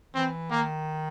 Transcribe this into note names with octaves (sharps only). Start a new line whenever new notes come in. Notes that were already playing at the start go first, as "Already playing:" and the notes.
E3 C4
D#3 A#3